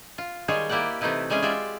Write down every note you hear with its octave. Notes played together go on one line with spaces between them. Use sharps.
F4
D#3 G3 G#3 G#4 C5 C#5
A#3 E4 G4 D5 F#5
C3 E3 A3 D#4 E4 B4
G3 G#3 C#4 G#4
G#3 F4 G4 D5 E5